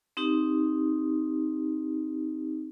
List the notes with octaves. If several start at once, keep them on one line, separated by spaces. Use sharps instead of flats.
C4 D#4 G4